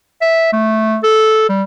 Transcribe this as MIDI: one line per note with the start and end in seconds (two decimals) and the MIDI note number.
0.21 0.49 76
0.53 0.97 57
1.04 1.48 69
1.49 1.63 55